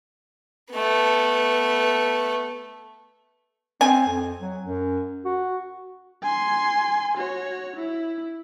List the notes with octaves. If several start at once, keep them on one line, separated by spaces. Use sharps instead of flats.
A3 B3
C4 G#5
F2
F#3
F#2
F#4
G#5 C6
F#4 C#5
E4